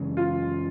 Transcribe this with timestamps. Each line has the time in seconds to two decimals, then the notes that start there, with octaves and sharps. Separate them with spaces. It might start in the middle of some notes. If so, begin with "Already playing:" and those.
Already playing: F#2 C#3 E3 G#3
0.17 F4